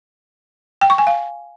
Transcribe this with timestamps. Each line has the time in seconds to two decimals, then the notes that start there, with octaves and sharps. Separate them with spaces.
0.81 G5
0.90 C#6
0.98 G#5
1.07 F5